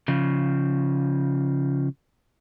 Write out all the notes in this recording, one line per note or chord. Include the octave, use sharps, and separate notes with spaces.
C#3 F3